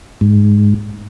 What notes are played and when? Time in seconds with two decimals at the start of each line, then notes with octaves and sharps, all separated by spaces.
0.21 G#2